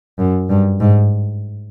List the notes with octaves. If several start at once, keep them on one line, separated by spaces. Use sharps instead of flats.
F#2
G2
G#2